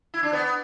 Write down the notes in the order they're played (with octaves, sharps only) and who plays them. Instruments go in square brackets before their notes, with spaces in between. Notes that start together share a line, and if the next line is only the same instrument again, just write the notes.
[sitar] E4
D4
B3